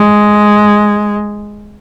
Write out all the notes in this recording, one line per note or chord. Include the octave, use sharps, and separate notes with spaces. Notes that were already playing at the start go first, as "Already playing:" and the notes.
Already playing: G#3